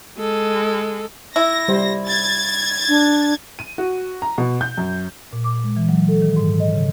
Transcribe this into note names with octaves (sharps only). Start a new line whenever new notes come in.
G#3 A4
E4 A#6
G3 C5
G#6 A6
D4
D#7
F#4
A#5
B2
G6
F#2
A#2
D6
G#3
E3
F#3
A4
D#3
G#2
D#5
C#3